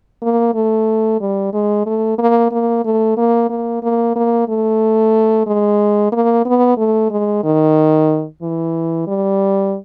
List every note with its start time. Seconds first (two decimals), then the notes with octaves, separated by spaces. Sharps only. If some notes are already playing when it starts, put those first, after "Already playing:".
0.22 A#3
0.54 A3
1.20 G3
1.53 G#3
1.86 A3
2.19 A#3
2.52 A#3
2.85 A3
3.17 A#3
3.50 A#3
3.83 A#3
4.16 A#3
4.49 A3
5.47 G#3
6.12 A#3
6.46 B3
6.78 A3
7.11 G#3
7.44 D#3
8.42 E3
9.07 G3